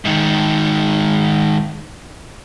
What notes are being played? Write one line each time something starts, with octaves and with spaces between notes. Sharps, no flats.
G#2 D#3